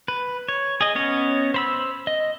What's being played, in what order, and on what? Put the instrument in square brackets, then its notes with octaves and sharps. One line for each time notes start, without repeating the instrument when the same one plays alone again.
[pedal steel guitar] B4
C#5
G#4 D#5
B3 C#4 C#5 D#5
C5 B5 E6
D#5